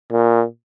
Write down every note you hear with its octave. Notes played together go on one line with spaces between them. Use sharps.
A#2